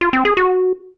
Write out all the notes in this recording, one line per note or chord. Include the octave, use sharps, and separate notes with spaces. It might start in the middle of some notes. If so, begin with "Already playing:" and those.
F4
C4
G#4
F#4